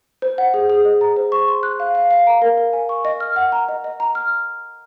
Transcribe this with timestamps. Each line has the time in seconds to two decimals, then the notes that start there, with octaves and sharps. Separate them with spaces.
0.22 C5
0.38 F#5
0.54 G#4
0.70 G#4
0.85 D#5
1.01 A#5
1.17 C5
1.32 C#6
1.48 C6
1.63 F#6
1.80 F5
1.95 F5
2.11 F5
2.27 A#5
2.42 A#4
2.57 A#4
2.73 G#5
2.89 C#6
3.05 D#5
3.20 F6
3.36 F#5
3.52 A#5
3.69 D#5
3.84 D#5
4.00 A#5
4.15 F6